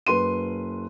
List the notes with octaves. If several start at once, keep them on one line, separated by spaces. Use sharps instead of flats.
F#1 B4 C6 D#7